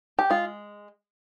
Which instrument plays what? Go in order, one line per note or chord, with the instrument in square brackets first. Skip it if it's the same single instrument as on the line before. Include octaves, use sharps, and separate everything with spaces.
[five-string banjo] G4
G#3 F4